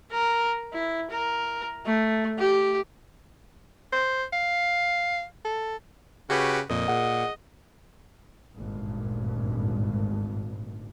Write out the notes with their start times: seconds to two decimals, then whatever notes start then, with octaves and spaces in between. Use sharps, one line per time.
0.11 A#4
0.73 E4
1.10 A#4
1.85 A3
2.38 G4
3.92 C5
4.33 F5
5.45 A4
6.30 C#3 F#4 G4 B4
6.70 F2 A#2 A#4 D#5
6.88 A#2 G#4 F#5
8.56 G#1 D2 G2 A#2